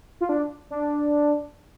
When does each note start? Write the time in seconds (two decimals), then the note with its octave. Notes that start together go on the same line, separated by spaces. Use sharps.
0.21 F4
0.29 D4
0.70 D4